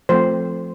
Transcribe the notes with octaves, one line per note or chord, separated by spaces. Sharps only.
F3 A3 C4 C5